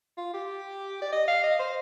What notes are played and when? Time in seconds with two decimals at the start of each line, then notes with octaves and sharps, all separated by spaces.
0.17 F4
0.34 G4
1.02 D5
1.12 D#5
1.28 F5
1.43 D#5
1.59 C5